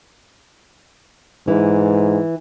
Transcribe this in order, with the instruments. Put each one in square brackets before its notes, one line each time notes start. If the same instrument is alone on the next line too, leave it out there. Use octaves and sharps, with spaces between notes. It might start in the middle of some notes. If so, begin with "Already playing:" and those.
[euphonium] G#2 [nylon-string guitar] E3